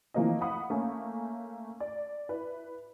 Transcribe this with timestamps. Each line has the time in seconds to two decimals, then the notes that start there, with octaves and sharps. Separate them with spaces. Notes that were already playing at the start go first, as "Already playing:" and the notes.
0.14 E3 F3 A3 A#3 C4 D#5
0.41 F5 F#5 B5 D#6
0.70 A3 A#3 C#4
1.80 D5
2.29 E4 B4